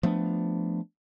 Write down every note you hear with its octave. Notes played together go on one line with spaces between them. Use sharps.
F3 A3 B3 D4